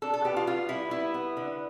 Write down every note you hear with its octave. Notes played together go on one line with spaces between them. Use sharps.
D4 A4
A4
B3 G4
F4
B3 F4
G3 E4
B3 E4
B3
D3